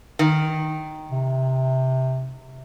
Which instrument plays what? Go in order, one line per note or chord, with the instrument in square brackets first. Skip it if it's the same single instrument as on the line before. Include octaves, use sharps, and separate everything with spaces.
[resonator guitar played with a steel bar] D#3
[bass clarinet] C3